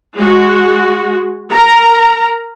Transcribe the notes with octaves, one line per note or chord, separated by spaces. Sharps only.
G#3 F#4
A#4 A#5